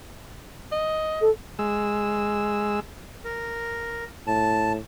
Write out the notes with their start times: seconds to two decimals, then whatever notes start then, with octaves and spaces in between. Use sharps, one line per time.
0.72 D#5
1.21 A4
1.59 G#3 E6
3.25 A#4
4.27 A2 A5